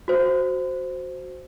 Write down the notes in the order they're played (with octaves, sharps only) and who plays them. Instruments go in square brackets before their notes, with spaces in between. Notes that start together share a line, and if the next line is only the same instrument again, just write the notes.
[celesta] F#4 C5